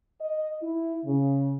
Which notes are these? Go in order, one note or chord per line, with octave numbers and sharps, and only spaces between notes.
D#5
E4
C#3